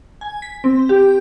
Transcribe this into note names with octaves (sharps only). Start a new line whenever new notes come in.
G#5
B6
C4
G4